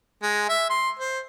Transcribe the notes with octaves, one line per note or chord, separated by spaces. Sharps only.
G#3
E5
C6
C5